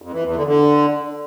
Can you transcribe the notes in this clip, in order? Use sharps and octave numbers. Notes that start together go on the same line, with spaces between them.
F2
E3
E2
D3
D3